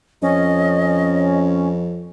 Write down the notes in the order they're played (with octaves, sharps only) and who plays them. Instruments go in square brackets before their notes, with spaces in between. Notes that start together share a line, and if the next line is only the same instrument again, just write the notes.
[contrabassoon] F2 [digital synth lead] C#4 [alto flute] D#5